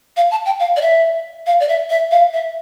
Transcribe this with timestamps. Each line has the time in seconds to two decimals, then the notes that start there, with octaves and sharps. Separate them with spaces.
0.17 F5
0.31 A5
0.46 G5
0.60 F5
0.76 D5
0.82 E5
1.46 F5
1.60 D5
1.69 E5
1.90 E5
2.11 F5
2.33 E5